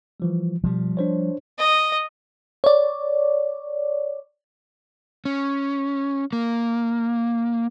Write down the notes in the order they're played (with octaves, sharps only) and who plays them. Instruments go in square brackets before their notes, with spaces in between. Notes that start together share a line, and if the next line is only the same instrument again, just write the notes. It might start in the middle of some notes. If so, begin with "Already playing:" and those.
[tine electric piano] E3 F3 G3
[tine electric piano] B2 [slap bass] F3 G3
[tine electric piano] D4 C5 C#5
[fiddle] D#5
[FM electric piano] C#5 D5
[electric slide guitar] C#4
A#3